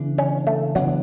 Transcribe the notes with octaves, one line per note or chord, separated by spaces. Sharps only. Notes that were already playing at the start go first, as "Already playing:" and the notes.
Already playing: C#3 E3 B3 D4
C#4
A3
C#3 E3 F#3 B3 D4